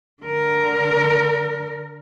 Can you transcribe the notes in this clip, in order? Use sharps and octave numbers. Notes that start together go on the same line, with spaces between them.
D3 A#4